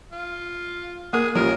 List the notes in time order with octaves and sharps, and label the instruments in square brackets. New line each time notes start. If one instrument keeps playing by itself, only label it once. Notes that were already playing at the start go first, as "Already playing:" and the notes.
[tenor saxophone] F4
[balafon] A#3 A#4 [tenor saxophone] G#4
[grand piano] A1 F3 C#4 [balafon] G4 [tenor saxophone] A#4